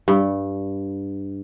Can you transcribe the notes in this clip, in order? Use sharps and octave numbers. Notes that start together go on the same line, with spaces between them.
G2